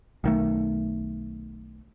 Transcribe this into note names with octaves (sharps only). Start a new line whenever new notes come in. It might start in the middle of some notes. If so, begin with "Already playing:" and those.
B1 D#3 A3